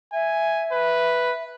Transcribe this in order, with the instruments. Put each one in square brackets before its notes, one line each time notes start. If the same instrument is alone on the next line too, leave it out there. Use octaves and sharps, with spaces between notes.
[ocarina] E5 [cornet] G#5
[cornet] B4